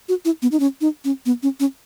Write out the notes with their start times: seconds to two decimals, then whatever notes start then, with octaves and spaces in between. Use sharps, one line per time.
0.09 F#4
0.25 E4
0.42 B3
0.52 D#4
0.60 C#4
0.81 D#4
1.05 C#4
1.26 B3
1.43 C#4
1.60 C#4